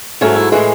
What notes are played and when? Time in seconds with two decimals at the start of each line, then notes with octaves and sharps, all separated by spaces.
0.21 G#2 F#3 A3 C#4
0.36 E4
0.52 A2 E3 G#3 F#4